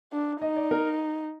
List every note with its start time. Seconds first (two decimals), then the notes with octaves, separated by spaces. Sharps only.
0.12 D4
0.41 D#4 D#5
0.56 D5
0.71 A#4